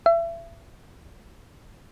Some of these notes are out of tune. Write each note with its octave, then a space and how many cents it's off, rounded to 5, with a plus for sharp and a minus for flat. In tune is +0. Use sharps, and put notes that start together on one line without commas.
E5 +30